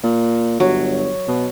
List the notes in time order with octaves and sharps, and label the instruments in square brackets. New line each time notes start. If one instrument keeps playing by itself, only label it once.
[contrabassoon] A#2
[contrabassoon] G1 [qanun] F#3
[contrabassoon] B2